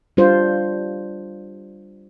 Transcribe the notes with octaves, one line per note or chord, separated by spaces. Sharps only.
G3 D4 F4 C5